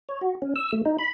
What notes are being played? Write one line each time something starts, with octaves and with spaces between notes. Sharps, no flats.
C#5
F#4
C#4
E6
A3
D#4
B5